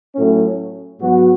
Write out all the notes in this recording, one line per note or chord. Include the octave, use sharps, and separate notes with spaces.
A2 F#3 C#4
G#2 F#3 B3 F#4